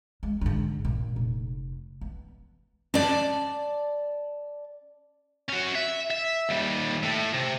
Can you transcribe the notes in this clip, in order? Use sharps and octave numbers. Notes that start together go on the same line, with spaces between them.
G#3
G#2 D3
A#2
F1
B3
C#4 D5 A5
C#4 F#4
E5
E5
D#2 G3
A2
C3